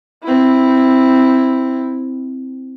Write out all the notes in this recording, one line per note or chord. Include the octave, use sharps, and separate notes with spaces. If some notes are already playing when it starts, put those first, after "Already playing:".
C4 E4